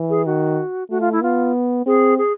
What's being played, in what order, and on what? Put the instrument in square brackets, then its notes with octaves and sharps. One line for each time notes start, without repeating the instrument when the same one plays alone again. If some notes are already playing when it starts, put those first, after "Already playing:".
Already playing: [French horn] E3
[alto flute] G#4
[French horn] D#3 [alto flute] F#4
[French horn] A3 [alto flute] F#4
[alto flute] F4
E4
[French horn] B3 [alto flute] F4
[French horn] C4 [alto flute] G#4
[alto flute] G#4